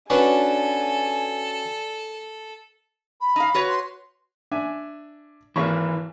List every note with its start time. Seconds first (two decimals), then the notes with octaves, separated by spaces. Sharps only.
0.10 C#4 D4 F#4 A4 B4 G#5
3.21 B5
3.36 D#4 F5
3.54 F#4 B4 C#5
3.68 C6
4.51 D4 E5 G#5
5.56 G#1 E3 A#3 C#6